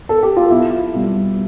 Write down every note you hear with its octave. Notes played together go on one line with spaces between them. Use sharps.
A4
G4
F4
B1 E4
B2 G3